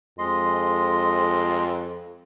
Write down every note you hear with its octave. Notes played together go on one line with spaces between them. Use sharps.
F2 G#3 D#5 C6